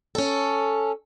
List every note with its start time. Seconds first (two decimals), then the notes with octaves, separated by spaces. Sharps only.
0.15 C#4 A4